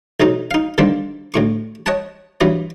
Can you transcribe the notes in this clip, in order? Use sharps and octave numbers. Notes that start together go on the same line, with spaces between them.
B1 C3 F#3 D#4
D#4 F5
D3 D#3 G3 A#3 C4
D2 A2 C#6
C#5 D#5 F#5 G5 A5
G2 E3 F#3 B3